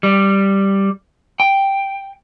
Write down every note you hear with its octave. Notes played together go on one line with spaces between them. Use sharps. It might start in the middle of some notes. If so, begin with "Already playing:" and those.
G3
G5